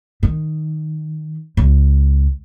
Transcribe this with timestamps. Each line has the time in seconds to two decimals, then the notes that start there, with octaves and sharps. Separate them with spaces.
0.23 D#3
1.57 C#2